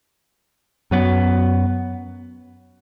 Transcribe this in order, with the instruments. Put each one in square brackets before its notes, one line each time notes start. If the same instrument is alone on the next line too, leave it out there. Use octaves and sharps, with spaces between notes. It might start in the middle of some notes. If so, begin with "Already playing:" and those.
[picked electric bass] F#2 F#3 B3